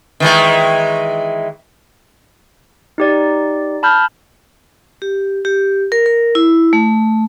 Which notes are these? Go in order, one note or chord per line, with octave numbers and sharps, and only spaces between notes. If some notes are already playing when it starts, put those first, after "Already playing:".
D#3 E3 G#3
D#4 G4 D5
A5 B5 F6 G6
G4
G4
A#4
A#4
E4
A3